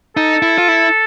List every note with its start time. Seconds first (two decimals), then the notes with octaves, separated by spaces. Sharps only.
0.17 D#4 A4
0.42 E4
0.58 F4
0.68 E4